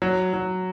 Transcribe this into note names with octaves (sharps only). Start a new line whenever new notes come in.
F#3
F#3